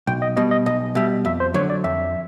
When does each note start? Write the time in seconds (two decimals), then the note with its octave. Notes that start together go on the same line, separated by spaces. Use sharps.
0.07 B1 G5
0.22 D#5
0.37 B2 G3 D#5
0.51 D#5
0.66 B1 D#5
0.95 B2 G3 E5
1.25 F2 E5
1.40 C5
1.54 D3 F#3 C#5
1.70 D5
1.84 F2 E5